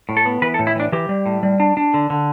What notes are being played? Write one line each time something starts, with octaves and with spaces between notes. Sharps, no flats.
A2
A4
B3
E3 B4
A4
A2
E4
E3 D4
E3 G4
G3
A2
G3
D4
D4
D3
D3